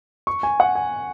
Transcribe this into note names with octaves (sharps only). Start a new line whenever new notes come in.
C#6
G#5
F#5
G#5